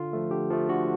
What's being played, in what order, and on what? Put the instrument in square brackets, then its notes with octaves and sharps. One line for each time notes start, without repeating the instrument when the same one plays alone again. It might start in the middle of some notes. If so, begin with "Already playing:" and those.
Already playing: [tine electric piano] D3 F4
F3 A3
D3 G4
F3 A3
D3 F#4